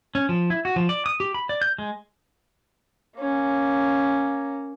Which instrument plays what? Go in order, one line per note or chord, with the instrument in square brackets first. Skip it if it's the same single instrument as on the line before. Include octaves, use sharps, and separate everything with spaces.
[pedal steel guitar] C#4
F3
E4
F#4
F3
D5
D#6
G4
B5
D5
G6
G#3
[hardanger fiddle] A#3 C#4